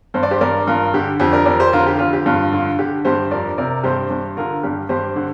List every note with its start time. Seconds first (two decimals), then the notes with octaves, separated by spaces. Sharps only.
0.14 G2 C5
0.23 D5
0.31 G4 C5
0.41 G2 A#4 D5
0.67 G2 F4 A#4
0.94 D3 G4
1.20 F2 G4
1.33 A#4 D5
1.46 F2 A#4 D5
1.60 G4 C5
1.73 D3 F4 A#4
1.87 G4
1.99 F2 F4
2.13 G4
2.26 G2 F4
2.52 D3 F4
2.79 D3 G4
3.05 G2 G4 C5
3.31 F2 A#4 D5
3.57 C3 A#4 D5
3.84 G2 G4 C5
4.10 G2
4.37 D3 F4 A#4
4.63 G2 G4
4.89 G2 G4 C5
5.16 D3